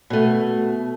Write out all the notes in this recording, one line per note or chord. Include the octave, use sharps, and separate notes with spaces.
B2 A3